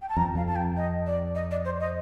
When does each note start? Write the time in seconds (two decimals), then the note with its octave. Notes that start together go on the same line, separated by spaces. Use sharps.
0.02 G5
0.09 A5
0.17 F2 A#5
0.35 F2 F5
0.47 A5
0.56 G5
0.77 D#5
1.06 D5
1.35 D#5
1.51 D5
1.65 C5
1.80 D#5